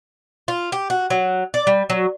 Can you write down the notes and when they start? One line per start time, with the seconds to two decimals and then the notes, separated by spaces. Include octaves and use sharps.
0.48 F4
0.72 G4
0.90 F#4
1.10 F#3
1.54 D5
1.67 G3
1.90 F#3